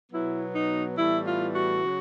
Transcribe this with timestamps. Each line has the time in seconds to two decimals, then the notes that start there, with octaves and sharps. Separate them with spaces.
0.12 B2 F#3 B3 E4
0.55 D#4
0.98 A2 E3 G3 B3 E4
1.27 F4
1.55 F#4
1.84 C#3 F#3